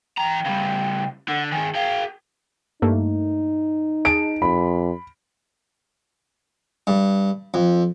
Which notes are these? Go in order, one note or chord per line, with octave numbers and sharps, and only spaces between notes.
E3 G5 A#5
C#3 G3
D3 F#5
D#3 G#4 G#5
G#4 F5 G5
G2 A3 A#3 D#4
G#4 D#5 A5 D7
F2 B5
G2
F2